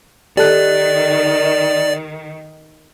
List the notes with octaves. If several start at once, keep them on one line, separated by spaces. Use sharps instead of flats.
D#3 G4 A4 D5 F#6